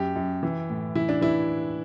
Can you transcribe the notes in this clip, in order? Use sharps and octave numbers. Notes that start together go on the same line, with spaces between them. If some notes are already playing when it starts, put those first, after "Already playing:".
Already playing: F#2 G4
F#2
E3
A2
E3 E4
D4
E3 E4